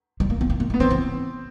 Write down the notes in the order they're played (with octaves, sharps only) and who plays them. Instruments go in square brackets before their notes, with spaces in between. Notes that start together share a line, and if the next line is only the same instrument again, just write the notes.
[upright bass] G3
A#3
B3
A#3
A#3
G#3
[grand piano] B3
[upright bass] F3 [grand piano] C4
[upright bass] E3